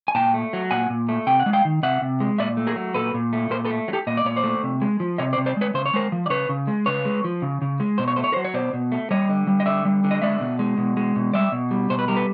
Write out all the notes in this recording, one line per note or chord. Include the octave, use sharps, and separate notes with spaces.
G#5
A#2 G5 A5
A3
F#3
A#2 F#5 G#5
A#2
A3
C3 G5
F#5
G#3
F5 G5
D#3
C3 E5 F#5
C3
G#3
A#2 D5 E5
A3
G#4 A#4
F#3
A#2 A4 B4
A#2
A3
A#2 A#4 C5
A4 B4
A3
F#3
G4 A4
A#2 D#5
D5
A#2 C#5
C5 D5
A3
C3
G#3
F3
C3 C#5 D#5
C5 D5
C3
C5 D5
G#3 B4 C#5
C#3 C5
C#5
G#3 A#4 C5
F3
D5
C#3 B4 C#5
C#3
G#3
C#3 B4 C#5
G#3
F3
C#3
C#3
G#3
B2 C5
C#5
A3 C5
C#5
A#4 C5
F#3
C#5
B2 C5 D5
B2
A3
G3 C#5 D#5
D3
G3
D#5
D3 D5 E5
G3
D3
D#5
G#3 D5 E5
B2
G#3
B2
G#3
B2
G3 D5 E5
B2
G3
B2 C5
B4
G3 A#4
A4 B4